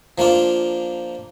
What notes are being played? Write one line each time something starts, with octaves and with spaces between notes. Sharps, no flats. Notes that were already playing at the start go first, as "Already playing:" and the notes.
F3 A#3 D4 F4